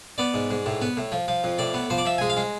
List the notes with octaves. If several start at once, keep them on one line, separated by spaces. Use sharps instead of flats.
B3 D5
G#2
G#2
A2
B3
A2
F3
F3
F2
A2 D5
B3
F3 C5
D5
F3 E5
G#3 G#5
F5
G#3